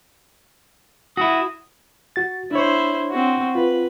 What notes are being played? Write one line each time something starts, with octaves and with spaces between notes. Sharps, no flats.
E4 F#4 D#6
F#4 A6
D4 E4 C5 C#5
C4 F#4
F4 B4